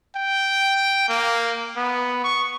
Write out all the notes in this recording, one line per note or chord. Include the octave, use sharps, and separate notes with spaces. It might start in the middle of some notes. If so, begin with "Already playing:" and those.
G5
A#3
B3
C#6